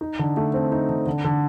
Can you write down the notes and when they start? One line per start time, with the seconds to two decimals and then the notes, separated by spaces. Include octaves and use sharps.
0.01 D#4
0.19 D3
0.37 A3
0.54 C4
0.72 D#4
0.89 D3
1.07 D3
1.25 D3